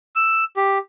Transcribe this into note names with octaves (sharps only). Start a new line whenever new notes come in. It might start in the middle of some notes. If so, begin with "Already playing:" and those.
E6
G4